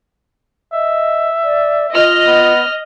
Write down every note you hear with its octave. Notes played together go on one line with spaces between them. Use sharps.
D#5 E5
D5
F4 D#5 F6
B3